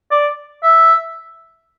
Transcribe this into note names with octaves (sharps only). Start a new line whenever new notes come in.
D5
E5